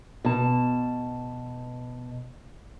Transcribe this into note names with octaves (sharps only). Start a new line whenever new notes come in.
B2 A5